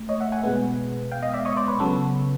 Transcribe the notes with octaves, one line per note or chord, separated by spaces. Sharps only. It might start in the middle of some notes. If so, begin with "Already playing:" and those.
Already playing: A3
C#5 D#5
E5 F#5
F#5 G#5
B2 G#3 B3
F5 G5
D#5 F5
D5 E5
C#5 D#5
C5 D5
B4 C#5
C#3 F#3 B3 A4 B4